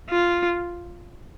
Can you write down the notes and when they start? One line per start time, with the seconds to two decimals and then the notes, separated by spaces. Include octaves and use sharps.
0.10 F4